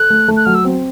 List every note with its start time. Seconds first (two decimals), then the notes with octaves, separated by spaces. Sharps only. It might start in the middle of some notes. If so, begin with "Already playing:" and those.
Already playing: A4 F#6
0.10 A3
0.28 A3
0.37 F#6
0.45 F#3 F6
0.55 E6
0.64 C4